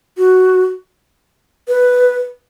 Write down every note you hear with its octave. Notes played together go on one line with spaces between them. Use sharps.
F#4
B4